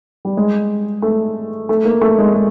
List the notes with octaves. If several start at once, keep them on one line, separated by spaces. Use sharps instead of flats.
G3
G#3
A3
A3
A#3
A3
G#3
G#3